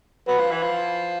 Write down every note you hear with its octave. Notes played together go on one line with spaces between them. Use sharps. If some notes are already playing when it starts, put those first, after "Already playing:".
F#3 B4
F3
E3
F3